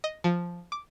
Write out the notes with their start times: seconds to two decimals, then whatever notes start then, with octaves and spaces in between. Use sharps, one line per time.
0.04 D#5
0.24 F3
0.72 D6